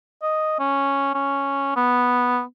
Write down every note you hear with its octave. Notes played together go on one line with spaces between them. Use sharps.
D#5
C#4
C#4
B3